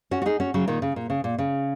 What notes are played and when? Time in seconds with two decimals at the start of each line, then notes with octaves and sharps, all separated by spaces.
0.11 C#4 F#4
0.22 F#4
0.26 D#4 G#4
0.40 C#4 F#4
0.54 C#3 F#3
0.68 A#2 D#3
0.82 C#3
0.96 A#2
1.10 C#3
1.24 A#2
1.38 C#3